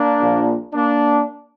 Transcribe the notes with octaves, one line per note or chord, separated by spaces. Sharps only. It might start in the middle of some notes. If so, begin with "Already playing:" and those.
Already playing: A#3 D4
A#1 A#2 F3
A#3 D4